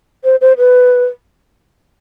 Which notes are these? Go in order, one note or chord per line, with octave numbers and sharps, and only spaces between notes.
C5
C5
B4